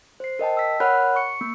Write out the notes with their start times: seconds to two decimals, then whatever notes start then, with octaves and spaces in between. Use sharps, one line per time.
0.20 C5 C7
0.39 A#4 D#5 G5 A5
0.57 E6 B6
0.80 A#4 C#5 F#5 B5 F6 F#6
1.16 C#6 C#7
1.41 A#3